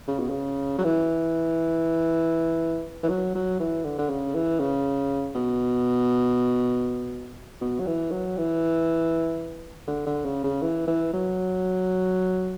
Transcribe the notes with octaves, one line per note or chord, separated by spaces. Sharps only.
C#3
B2
C#3
F#3
E3
E3
F#3
F#3
E3
D3
D3
C#3
E3
C#3
B2
B2
F#3
E3
F#3
E3
D3
D3
C#3
C#3
E3
E3
F#3